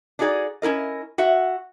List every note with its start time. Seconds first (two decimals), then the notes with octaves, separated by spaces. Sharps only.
0.19 D4 D#4 F#4 G#4 D5
0.62 C#4 E4 A#4 D#5
1.18 F#4 E5 F#5